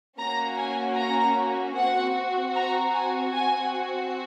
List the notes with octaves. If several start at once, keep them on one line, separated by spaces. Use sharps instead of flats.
A#3 C#4 F#4 A#5
G#5
A#5
C4 F#4 F#5
A#5
G#5
C4 F#4 G#5